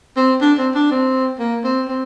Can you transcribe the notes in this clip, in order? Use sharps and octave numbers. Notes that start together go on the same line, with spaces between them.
C4
D4
C4
D4
C4
A#3
C4
C4